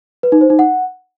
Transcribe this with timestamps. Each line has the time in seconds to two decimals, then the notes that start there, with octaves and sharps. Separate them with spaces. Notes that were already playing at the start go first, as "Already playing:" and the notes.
0.23 B4
0.32 D#4
0.41 C5
0.50 D#4
0.59 F#5